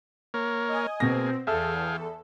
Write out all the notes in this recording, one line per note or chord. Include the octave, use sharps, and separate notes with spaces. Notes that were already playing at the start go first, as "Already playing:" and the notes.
A#3 A#4 C#5
D#5 G#5
B2 A#3 C4 G#4 A#6
E2 G#4 A4 E5 F5 G5 A5 E6